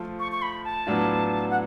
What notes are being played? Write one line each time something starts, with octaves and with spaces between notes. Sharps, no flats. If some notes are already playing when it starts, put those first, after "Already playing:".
Already playing: F3 A3 F4
C#6
C#6
B5
A5
A2 F#3 B3 D4 F4
F#5